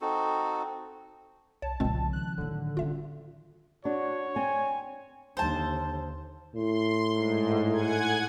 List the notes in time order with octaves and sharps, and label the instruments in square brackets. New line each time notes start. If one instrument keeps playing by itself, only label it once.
[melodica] C4 D#4 F#4 A4
[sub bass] C2 [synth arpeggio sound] C#5 [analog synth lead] A5
[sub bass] C2 [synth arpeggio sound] A#2 G#3 C4 [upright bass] C#3 F3
[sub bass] D#3 [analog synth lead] F#6
[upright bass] A2 F#3 [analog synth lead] D3
[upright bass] G3 C#4 [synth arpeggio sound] F4 E5
[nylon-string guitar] D4 [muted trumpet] F#4 [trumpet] C#5
[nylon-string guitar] C4 [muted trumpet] G#5
[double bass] D#2 D3 [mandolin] C5 A5
[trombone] A2 [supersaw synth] C6
[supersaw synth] G#2
F#5 G#5 G#6